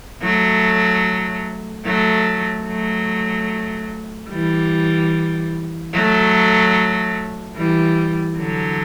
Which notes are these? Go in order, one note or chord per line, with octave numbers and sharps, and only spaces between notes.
F#3 A3
F#3 A3
F#3 A3
E3 G3
F#3 A3
E3 G3
D3 F#3